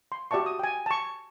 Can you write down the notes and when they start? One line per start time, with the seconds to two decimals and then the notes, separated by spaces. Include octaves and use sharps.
0.12 C6
0.31 F#4 G4 D5 E5 A5 C#6
0.46 D#6
0.59 G5 G#5
0.86 A5 C#6